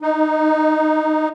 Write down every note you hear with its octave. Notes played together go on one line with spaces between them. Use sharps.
D#4